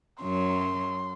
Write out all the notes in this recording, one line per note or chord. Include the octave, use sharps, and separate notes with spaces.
F#2 F#3 C6